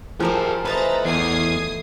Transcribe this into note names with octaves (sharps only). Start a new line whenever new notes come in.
F3 G3 G4 G#4 A#4 C5
E3 A3 D#4 B4 C5 A#5 A6
E2 D#6 G#6 C7